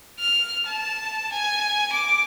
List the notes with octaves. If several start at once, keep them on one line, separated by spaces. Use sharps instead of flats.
F6
A5
G#5
D6